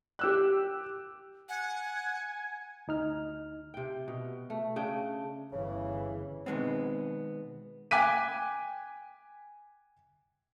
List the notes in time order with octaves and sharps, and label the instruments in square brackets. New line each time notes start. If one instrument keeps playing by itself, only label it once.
[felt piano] G4 E6 F#6
[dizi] F#5 [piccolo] G#5
[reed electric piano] D2 D#4 F6
[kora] C3 G5
B2
A3
C#3 D4 G5
[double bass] G1 E3 [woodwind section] C#3
[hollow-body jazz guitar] B2 D#3 G#3 B3 C4
[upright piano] G5 G#5 D6 F#6 B6 D#7